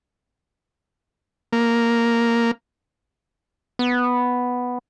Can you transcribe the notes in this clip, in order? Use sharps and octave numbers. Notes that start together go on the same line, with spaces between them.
A#3
B3